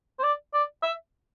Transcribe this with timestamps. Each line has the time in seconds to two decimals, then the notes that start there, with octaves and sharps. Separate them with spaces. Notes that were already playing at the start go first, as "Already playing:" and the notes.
0.19 C5
0.23 D5
0.54 D5
0.82 E5